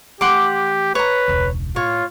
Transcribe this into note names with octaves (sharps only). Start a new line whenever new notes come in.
E3 A3 G4 F#5 C6 D6
B4 C#5 A#5
E1 C#2
A2 F4 C#5